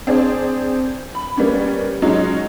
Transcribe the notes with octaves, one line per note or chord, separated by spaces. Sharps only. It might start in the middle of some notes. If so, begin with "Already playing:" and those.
C4 D4 G#4
B5
G3 A#3 B3 C#4
F#3 G#3 C#4 D#4